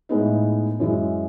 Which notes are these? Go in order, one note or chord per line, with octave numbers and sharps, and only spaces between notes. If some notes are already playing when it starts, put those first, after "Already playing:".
A2 G#3 B3 D#4
F#2 E3 G#3